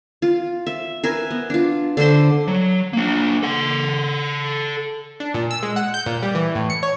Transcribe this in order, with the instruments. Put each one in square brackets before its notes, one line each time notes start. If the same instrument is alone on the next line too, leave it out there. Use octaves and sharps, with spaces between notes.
[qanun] F4
E5
A#4 B4 E5 G#5
B3
D4 F4
D3 A4 C5 C6
[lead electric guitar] F#3
A#3 D4
A4 F#5
[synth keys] D4
A#2
E6
G#3
F#5
G6
A#2
G3
E3
A2
C#7
C#5